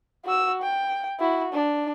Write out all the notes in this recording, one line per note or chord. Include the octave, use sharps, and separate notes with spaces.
F#4 E6
G5
E4 F#4
D4